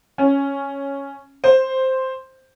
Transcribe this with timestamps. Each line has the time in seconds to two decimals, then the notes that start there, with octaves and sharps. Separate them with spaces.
0.18 C#4
1.44 C5